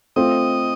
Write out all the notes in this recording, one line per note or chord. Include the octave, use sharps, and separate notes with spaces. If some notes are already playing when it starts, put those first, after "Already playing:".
A3 C4 F4 D#5